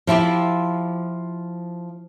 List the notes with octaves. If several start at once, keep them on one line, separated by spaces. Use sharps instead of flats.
F3 E4 F4 G4